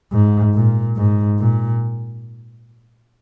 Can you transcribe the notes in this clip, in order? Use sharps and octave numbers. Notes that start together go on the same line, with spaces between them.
G#2
A#2
G#2
A#2